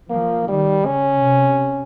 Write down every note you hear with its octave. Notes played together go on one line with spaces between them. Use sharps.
F3 A#3
D#3 G3
C#3 C#4
C3